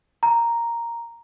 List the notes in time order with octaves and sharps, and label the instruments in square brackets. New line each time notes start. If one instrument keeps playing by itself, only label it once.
[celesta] A#5